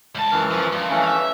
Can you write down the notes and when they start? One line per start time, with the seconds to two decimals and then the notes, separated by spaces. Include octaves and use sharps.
0.15 C#2 A5
0.31 F#2 E3 F6
0.51 F3
0.73 G2
0.90 E3 A3 C#4
1.04 E5 F5